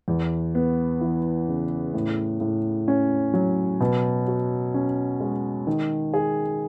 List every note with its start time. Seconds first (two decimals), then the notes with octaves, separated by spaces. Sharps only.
0.08 E2
0.55 B3
1.01 E3
1.48 C#3
1.94 A2
2.40 A2
2.88 C#4
3.34 F#3
3.80 B2
4.28 F#4
4.74 C#4
5.20 G#3
5.67 D#3
6.14 G#4